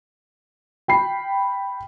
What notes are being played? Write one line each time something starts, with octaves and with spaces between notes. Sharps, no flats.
G5 B5 C7